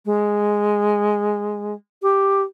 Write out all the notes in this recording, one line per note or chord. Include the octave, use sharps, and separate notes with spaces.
G#3
G4